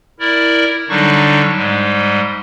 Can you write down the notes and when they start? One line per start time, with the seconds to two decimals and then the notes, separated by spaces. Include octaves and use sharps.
0.20 E4 A#4 D5
0.89 D3 F#3 G3 D4 D#4 C#6
1.56 G#2 G3 G#3